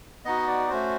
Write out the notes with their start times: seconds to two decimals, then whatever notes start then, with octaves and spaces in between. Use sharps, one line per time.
0.25 B3 D#4 F#4 D#5
0.48 D5
0.70 A3 C#4 F#4 C5